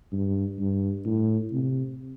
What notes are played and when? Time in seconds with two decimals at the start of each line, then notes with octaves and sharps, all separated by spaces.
0.13 G2
0.59 G2
1.05 A2
1.52 C3